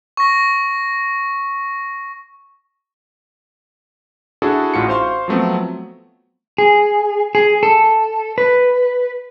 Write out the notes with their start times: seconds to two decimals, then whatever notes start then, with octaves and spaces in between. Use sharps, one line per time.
0.17 C#6 A#6
4.42 D4 E4 F#4 G#4 A4
4.74 A1 A2 F4 F#4 C#7
4.89 C5 F5 C6 C#6
5.28 F3 F#3 A3 B3 C4
6.58 G#4
7.35 G#4
7.63 A4
8.38 B4